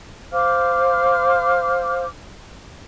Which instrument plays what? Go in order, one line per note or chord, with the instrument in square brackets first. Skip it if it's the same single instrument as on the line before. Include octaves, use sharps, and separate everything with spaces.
[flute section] C5 F5 D6 F6